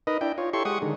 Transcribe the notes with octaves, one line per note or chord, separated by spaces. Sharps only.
D#4 A#4 B4 D#5
D4 E4 G5
F4 C#5
E4 G4 A4 C#5 C6 C#6
G#3 G4 F#5 C#6 D#6
D3 D#3 G#3